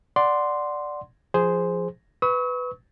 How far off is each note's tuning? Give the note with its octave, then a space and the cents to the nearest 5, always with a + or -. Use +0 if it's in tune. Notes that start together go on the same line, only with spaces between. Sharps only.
D5 +0 F#5 +0 C6 -5
F3 +0 G#4 +0 C5 -5
B4 +10 C#6 +0 E6 -45